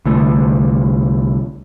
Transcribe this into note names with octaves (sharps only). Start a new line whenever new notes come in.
C2 D3 A3